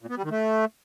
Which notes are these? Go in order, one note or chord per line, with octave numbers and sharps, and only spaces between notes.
A#2
B3
G3
D#3
A3